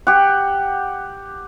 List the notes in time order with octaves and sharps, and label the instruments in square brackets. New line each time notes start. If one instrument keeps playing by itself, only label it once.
[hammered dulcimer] G4 F#5